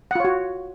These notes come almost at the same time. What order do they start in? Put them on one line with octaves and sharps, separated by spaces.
F#5 F4 C#5 F#4